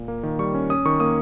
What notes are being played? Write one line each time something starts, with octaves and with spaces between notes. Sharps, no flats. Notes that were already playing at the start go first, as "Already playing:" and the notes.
Already playing: A#2
A#3
D#3
G3 C#6
C#4
C#4 D#6
D#3 C#6
A#3 D#6